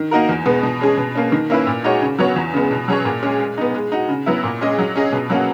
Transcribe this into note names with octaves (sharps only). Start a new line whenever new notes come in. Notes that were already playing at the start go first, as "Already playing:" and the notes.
Already playing: D#3
A#3 D#4 F#4 A#4
E2
B2 G#3 B3
B2
G#3 C#4 G#4
B2
A#3 C#4
D#3
A#3 C#4 E4 B4
A#2
G#3 D#4 F#4 C#5
C#3
F#3 B3 F#4 C#5
E2
C#3 G#3 B3
B2
F#3 C#4 G#4 C#5
A#2
G#3 C#4 G#4
G#3
B3 D#4
G#3
D#4 F#4
C#3
F#3 B3 E4
A#2
G#3 C#4 G#4 D#5
F#3
C#4 G#4 D#5
B2
F#3 A#3 C#4 F#4